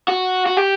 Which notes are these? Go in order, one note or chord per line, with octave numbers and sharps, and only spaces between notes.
F#4
F#4
G4